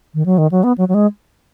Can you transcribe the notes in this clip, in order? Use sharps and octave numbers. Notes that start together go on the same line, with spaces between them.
D#3
F#3
D#3
F#3
B3
F#3
F#3
G#3